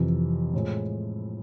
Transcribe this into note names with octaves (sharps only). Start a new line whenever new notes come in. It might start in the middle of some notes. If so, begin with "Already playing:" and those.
Already playing: F2 C3 E3
A2 F3 G#3